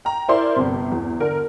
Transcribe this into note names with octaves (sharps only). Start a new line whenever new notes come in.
G5 A#5
E4 A#4 C5 D5 C6
G1 C3
E2
D3 A#4